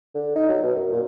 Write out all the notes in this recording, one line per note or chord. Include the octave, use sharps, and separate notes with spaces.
D3
D#4
F#3
B2
F#2
A#2